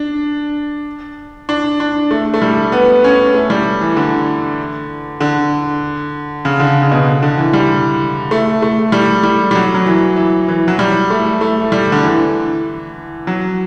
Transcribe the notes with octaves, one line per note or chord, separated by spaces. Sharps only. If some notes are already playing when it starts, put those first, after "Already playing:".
Already playing: D4
D4
D4
A3
A3
G3
B3
C#4
A3
G3
E3
D3
D3
C#3
D3
C#3
B2
D3
E3
G3
A3
A3
G3
G3
G3
F#3
F#3
E3
E3
E3
F#3
G3
A3
A3
G3
D3
E3
F#3